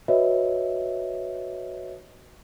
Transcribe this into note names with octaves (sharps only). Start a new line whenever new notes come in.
F#4 B4 C#5 D#5 E5